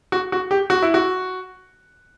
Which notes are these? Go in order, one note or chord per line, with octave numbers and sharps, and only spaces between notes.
F#4
F#4
G4
F#4
E4
F#4